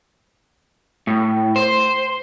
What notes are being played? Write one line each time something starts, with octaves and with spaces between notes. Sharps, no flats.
A2
C5